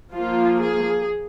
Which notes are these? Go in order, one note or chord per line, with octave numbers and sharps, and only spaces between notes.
F3 A#3 F4
G#4